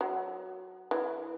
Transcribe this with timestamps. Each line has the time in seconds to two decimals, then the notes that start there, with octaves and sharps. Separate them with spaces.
0.01 F#3
0.91 E3